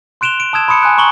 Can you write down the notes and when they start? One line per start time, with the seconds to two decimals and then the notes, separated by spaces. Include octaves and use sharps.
0.21 C6 F#6 D7 E7 F7 G7
0.40 D7
0.53 A5 D#6 E6 G#6 E7
0.68 B5 C6 D#6 C#7
0.82 G#5 C6 F#6 D7
0.98 A#5 C#6 F#7 G7